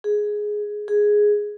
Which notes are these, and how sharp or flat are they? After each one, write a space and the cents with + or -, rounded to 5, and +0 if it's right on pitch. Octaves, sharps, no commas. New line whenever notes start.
G#4 +5
G#4 +0